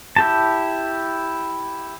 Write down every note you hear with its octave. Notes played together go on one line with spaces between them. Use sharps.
E4 G4 A5